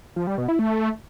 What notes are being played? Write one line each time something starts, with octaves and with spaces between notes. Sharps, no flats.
F3
G3
B2
E4
A3